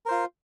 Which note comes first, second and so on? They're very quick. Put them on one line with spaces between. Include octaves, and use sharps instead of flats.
A#4 C5 F4